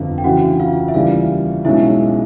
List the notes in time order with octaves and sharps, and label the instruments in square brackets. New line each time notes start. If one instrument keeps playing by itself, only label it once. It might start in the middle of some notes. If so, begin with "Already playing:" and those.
Already playing: [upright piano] G1 F2 D3 [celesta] F4 F5
[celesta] G5
[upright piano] D2 C#3 E3 [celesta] F#4 F#5
[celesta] F4 F5
E5
[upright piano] D#2 C#3 E3 G3 [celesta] F4 F5
[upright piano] B1 B2 G#3 C#4 [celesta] E4 E5